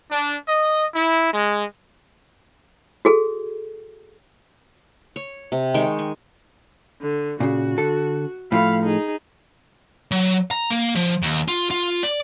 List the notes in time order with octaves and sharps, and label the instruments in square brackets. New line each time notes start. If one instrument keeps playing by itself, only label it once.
[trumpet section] D4
D#5
E4
G#3
[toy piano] F#4 G#4 A4
[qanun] C#5
C3
D#3 G#3 G5 C#6
G#5
[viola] D3
[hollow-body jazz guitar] A#2 C#3 [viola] F#4
[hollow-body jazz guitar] D3 A4
[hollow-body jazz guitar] A2 F3 A3 [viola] F5 B5
[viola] D#4 G#4
[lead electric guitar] F#3
A#5
A#3
F3
D#2
F4
F4
D5